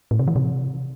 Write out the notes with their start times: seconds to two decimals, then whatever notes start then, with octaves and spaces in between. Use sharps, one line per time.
0.11 A2
0.19 C3
0.28 E3
0.36 C3